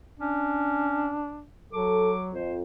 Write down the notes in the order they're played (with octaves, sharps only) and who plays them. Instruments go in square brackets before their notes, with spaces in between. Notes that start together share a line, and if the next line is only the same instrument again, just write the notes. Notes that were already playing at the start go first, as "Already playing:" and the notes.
[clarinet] C#4 [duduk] D4
[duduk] F#3 [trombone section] A4 [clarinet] D6
[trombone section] F2 [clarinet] C5